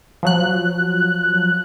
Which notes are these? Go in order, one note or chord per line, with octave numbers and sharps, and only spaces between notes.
F3 F#3 F#6